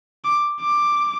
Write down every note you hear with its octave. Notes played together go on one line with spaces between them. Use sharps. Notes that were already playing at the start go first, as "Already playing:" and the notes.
D6
D6